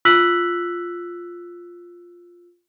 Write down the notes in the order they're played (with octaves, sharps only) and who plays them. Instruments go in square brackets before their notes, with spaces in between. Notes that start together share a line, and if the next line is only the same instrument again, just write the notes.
[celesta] F4 E6 F#6 B6 F#7